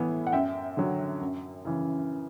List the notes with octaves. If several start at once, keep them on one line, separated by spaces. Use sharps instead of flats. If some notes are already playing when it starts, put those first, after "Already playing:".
Already playing: A2 E3 B3
F#5
F#2 E5 G5
D3 F#3
F#2
C#3 E3